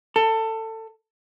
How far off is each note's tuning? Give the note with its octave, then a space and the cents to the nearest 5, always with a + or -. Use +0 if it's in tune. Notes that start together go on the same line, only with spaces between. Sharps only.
A4 +20